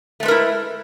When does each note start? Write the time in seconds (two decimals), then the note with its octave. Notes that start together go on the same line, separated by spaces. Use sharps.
0.20 A3
0.23 G#3
0.25 B4
0.28 A#4
0.31 E4